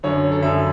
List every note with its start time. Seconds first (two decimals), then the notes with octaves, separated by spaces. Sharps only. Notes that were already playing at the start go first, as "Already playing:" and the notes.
0.03 F#2 D3 C#5
0.32 A4
0.41 F#2 D3 E5